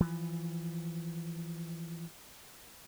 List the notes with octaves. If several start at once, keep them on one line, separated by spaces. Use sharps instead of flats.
E3 F3